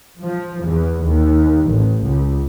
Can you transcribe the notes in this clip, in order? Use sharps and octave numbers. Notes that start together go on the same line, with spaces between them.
F3
E2
D#2
A1
C#2